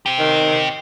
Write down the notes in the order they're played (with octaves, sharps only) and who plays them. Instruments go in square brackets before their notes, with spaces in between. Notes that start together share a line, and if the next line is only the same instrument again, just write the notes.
[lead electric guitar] C4 G4
[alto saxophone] D#3